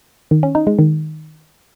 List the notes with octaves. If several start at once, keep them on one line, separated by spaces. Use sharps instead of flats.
D#3
C#4
D#4
G#3
D#3